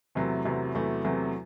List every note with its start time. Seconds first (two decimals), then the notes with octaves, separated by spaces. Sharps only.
0.15 E2 C3 F#3 A3 E4
0.45 E2 C3 F#3 A3 E4
0.74 E2 C3 F#3 A3 E4
1.04 E2 C3 F#3 A3 E4